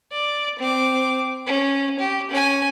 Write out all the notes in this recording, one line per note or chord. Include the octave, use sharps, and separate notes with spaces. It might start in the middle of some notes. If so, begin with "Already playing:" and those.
D5
C4 D6
C#4
G4
C#4 G#5